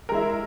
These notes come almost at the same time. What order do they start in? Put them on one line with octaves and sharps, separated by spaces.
A#4 G#3 E4